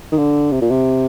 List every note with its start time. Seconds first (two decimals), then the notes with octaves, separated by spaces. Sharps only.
0.12 D#3
0.18 D3
0.52 C3
0.61 A#2
0.70 C3